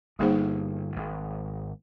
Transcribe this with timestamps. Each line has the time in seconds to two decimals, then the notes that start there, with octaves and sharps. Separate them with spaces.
0.19 G1 G2 G3 A#3 D#4 G#4 C5
0.96 G#1 G#2